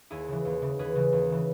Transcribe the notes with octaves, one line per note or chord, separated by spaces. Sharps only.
D#2 E4 G#4
C#3 E3
D#2
C#3 E3
D#2 G#4 B4
C#3 E3
D#2
C#3 E3